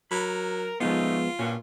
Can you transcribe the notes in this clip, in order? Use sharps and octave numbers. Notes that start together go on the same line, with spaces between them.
F#3 A#4 B5
F3 G#3 A3 B3 D#4 F4
G2 A#2 C#4 F#4